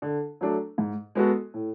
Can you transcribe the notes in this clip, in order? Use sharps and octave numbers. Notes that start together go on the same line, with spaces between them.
D3
F#3 A3 D4
G#2
G#3 B3 F#4 A4
A2